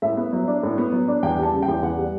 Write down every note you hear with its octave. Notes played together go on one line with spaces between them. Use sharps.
A2 E5
B3
F#3
D4
A2
B3
F#3
D4
E2 G5
G3 A5
C#3
G5
E2
E2 F#5
G3